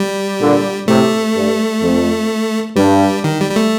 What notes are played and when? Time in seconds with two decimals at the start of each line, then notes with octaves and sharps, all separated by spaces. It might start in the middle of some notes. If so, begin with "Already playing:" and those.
Already playing: G3
0.40 A#2 D3
0.87 A2 C3 A3
1.35 G2
1.82 F2
2.76 G2 G3
3.24 D#3
3.41 G3
3.51 G3
3.56 A3